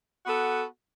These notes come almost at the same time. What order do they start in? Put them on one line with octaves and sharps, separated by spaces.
F#4 B3 A4